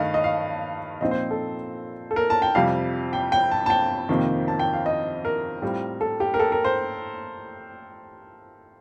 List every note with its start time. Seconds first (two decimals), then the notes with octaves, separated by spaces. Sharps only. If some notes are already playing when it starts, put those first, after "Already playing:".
Already playing: G2 D#3 A3 D#5 F5
0.14 D#5
0.24 F5
1.01 A#2 F3 C4 D#4 D#5
1.11 C5
1.31 A4
2.11 A4
2.16 A#4
2.30 A5
2.42 G5
2.55 F2 C3 G3 F5
3.13 G5
3.32 G5
3.51 A5
3.66 A5
3.70 G5
4.09 F2 C3 D#3 A#3
4.48 A5
4.59 G5
4.73 F5
4.86 D#5
5.25 A#4
5.62 A2 G3 C4 F4
6.01 A4
6.20 G4
6.34 A#4
6.39 A4
6.52 A#4
6.64 C5